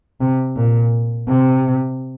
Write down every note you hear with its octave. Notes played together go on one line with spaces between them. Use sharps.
C3
A#2
C3